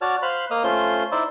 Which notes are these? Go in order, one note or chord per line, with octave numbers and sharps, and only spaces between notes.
F#4 C#5 D5 A5 F6
C5 F5 B5 F#6
A#3 D#5 F5
A3 C#4 F4 C5 C6
D#4 E4 C5 D5 E5